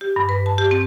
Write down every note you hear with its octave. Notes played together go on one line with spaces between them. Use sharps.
G4
G2
B4
A5
G4
C4